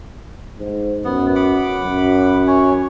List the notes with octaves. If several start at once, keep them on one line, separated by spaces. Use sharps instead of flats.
G#2
F#2 B3
F#5 B5 D6
F#2
C#4 C#5